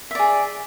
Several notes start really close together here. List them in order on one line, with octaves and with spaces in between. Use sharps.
E5 D5 G#4